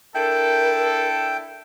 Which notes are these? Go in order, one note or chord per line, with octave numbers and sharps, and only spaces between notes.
D4 E4 A4 A#4 G5